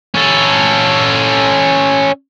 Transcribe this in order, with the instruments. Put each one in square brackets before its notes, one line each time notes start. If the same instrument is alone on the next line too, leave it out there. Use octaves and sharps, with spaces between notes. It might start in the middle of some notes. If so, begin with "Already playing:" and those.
[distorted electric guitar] C#4 A4